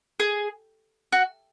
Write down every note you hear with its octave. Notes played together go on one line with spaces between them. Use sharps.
G#4
F#4